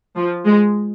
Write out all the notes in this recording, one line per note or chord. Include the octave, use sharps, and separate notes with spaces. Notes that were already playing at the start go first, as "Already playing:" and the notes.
F3
G#3